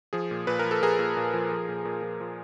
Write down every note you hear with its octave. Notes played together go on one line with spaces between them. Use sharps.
F3 G#4
A#2
A#2 B4
A#4
F3
A4
F3 G#4 A#4
A#2
A#2
F3
F3
A#2
A#2
F3
F3